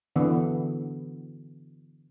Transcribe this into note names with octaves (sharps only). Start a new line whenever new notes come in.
D3 E3 B3